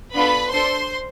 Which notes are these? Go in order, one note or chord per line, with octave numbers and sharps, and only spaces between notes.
B3 D4 F4 A4 B4 B5
D4 A4 C5 C6